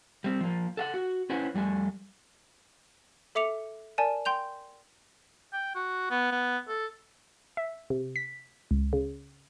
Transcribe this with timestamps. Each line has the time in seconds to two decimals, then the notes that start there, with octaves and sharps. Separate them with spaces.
0.24 G3 C4
0.40 F3 A#3
0.77 A4 F5 F#5
0.94 F#4
1.30 C#4 E4 B4 C5 F#5 G#5
1.54 F2 G3 A3 G#5
3.35 A4 E5 D6 C#7 F7
3.98 A#4 D5 G#5 A5
4.25 G5 C6 G6 F7
5.53 G5
5.75 F#4
6.10 B3
6.32 B3
6.68 A4
7.57 E5
7.90 C3
8.16 B6
8.71 C#2
8.93 C#3